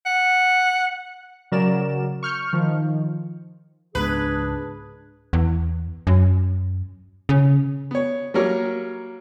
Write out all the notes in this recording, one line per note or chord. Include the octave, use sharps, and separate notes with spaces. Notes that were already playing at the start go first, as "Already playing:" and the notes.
F#5
C#3 F#3 A#4 D5 E7
C#6 F6 G6 C#7
D#3 F3
C#2 G#2 B3 D4 G#4 B4
E2
F#2
C#3
B3 C#5
F#3 G3 A#3 A#4 C#5